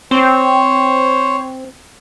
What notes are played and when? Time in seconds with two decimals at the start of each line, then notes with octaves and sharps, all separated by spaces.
0.11 C4 C5 C#5